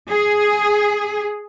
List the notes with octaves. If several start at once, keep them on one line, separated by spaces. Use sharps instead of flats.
G#4